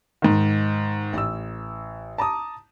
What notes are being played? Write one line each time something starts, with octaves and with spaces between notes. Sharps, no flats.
G#2 D#3
A1 E6
A5 A#5 D6 D#6